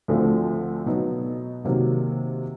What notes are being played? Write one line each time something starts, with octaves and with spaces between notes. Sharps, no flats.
D2 D3 F3 A3 C4
B2 F#3 B3 D#4
C3 D#3 F#3 A#3